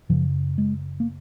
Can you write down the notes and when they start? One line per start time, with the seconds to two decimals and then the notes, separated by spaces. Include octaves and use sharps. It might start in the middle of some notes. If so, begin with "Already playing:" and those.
0.09 F#2 C#3 F3
0.58 G#3
1.00 A#3